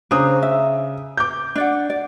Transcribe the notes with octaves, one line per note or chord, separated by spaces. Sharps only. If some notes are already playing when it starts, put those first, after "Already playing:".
C#3 D4 C5 A#5 D#6
E5
D6 G6
D4 D5 F#5
D5